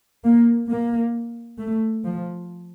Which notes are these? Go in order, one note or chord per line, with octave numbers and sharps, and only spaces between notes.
A#3
A#3
A3
F3